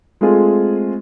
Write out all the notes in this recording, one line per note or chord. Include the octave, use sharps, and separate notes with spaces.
G#3 A3 C4 F4 G#4